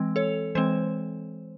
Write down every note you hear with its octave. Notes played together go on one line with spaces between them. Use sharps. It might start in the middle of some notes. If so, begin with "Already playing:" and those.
Already playing: E3 G#3 C4
A4 C#5
E3 G#3 C4 C5